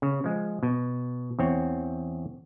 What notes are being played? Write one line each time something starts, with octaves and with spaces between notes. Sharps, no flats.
C#3
F3 G#3
B2
E2 C4 C#5